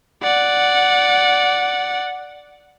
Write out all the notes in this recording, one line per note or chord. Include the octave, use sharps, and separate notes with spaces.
D5 F#5